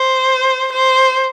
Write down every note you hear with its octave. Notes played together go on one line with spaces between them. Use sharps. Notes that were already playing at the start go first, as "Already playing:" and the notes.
Already playing: C5
C5